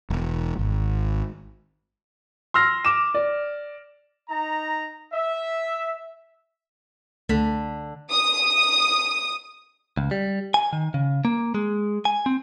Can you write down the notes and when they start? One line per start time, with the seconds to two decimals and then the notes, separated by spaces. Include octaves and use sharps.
0.10 E1
0.59 G#1
2.54 C6 E6 F6 A#6
2.85 D6 E7
3.14 D5
4.29 D#4 A#5
5.13 E5
7.29 C#2 D3 A3 B6
8.11 D#6
9.97 C#2
10.11 G3
10.54 G#5
10.73 D#3
10.94 C#3
11.25 A#3
11.55 G#3
12.05 G#5
12.26 C4